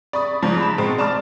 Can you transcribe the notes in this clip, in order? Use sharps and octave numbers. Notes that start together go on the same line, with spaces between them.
D5 B5 C#6 D#6
G#2 C#3 F3
A5 B5
B2 G#3 C4
D5 A5 A#5 D6 F6 A6